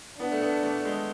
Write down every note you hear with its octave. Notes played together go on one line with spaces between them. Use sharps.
B3 D4
A3
B3
A3
G#3